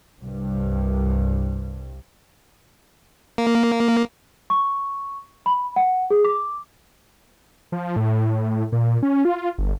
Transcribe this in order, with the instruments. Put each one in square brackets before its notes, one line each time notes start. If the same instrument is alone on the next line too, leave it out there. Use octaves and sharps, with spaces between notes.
[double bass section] C2 G2
[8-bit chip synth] A#3
[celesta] C#6
B5
F#5
G#4
D6
[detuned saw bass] F3
A2
A#2
C#4
F4
G1